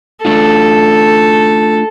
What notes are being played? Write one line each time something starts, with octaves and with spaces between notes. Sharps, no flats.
A3 D4 F4 A4